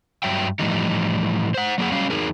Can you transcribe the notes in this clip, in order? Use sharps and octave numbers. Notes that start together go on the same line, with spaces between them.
G2 F#3 E5 G5
A2 E3 F3 G3 D#4
C5 F#5
F#3 A#3 D4 G#4 F#5
F#3 G3 C#4 F5
E2 D#4 G#4 A#4